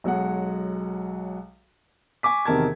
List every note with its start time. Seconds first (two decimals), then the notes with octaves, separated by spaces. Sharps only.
0.04 B1 F#3 G#3 F#5
2.23 G#5 C#6 D6 B6
2.45 E2 C3 D#3 A#4 A5 G#6